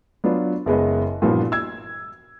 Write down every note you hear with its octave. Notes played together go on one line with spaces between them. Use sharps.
F#3 B3 D4 F4
F#1 G#3 B3 D#5
G2 A#2 E3 F3 B3 F#4
E6 G#6